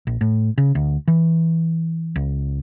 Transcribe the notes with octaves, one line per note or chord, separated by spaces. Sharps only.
A#1
A2
C#3
D2
E3
C#2